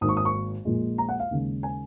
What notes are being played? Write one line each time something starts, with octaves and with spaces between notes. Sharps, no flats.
G#1 G#2 D#3 A#3 D#6
C#6
D#6
C#6
A#1 A#2 G#3
A#5
F#5
F5
D#2 C#3 G#3
G#5